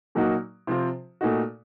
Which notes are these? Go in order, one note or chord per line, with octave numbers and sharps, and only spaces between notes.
A#2 F#3 A#3 D#4 F#4
C3 F3 C4 F4
A#2 A3 D#4 F#4